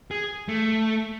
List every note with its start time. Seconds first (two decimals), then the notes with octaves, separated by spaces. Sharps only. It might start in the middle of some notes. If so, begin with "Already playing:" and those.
0.11 G#4
0.48 A3